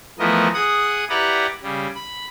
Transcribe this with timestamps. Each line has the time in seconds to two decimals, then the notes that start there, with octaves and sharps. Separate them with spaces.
0.19 E3 F3 A3 B3 A#4 D#5
0.54 G#4 F#5 D#6
1.10 E4 G4 B4 D5 F#5 A#5
1.63 C#3 G3
1.95 B5